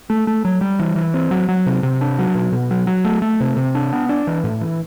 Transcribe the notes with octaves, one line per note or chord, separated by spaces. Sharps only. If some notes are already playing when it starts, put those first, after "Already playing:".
A3
A3
F#3
G3
E3
E3
C4
F#3
F#3
C3
C3
D4
F#3
B2
B2
F#3
F#3
A3
A3
C3
C3
D4
B3
D4
E3
A2
E3